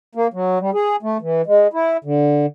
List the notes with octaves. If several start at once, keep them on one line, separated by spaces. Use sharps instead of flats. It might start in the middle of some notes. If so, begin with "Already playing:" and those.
A#3
F#3
G3
G#4
A3
E3
G#3
E4
D3